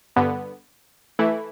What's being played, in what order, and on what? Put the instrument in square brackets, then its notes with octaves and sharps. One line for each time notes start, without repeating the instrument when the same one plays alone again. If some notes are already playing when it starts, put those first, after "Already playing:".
[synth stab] G2 D3 B3
E3 A3 E4